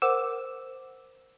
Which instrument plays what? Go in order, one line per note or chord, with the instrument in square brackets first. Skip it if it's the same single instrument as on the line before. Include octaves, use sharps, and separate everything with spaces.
[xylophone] A#4 C5 F#5 D6 E6 E7